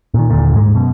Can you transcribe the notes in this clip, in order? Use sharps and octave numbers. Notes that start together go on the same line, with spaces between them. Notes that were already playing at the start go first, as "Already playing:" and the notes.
A#2 D#3
D#1 G#1 A#2 D3
G#2 G#3
F#2 B2